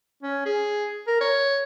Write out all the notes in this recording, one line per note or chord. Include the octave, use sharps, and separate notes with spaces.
C#4
G#4
A#4
C#5